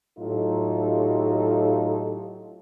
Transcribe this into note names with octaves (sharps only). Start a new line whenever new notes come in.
A2 F#3 D#4 F4 G4 A4